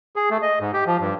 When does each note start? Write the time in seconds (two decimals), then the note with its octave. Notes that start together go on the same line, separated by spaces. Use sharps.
0.16 G#4
0.30 A3
0.42 D#5
0.60 G#2
0.73 G4
0.86 F3
1.01 G2